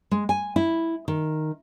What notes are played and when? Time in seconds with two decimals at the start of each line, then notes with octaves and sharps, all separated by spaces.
0.11 G#3
0.29 G#5
0.56 E4
1.08 D#3